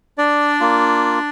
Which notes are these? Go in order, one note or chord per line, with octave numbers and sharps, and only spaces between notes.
D4 D5
A#3 F4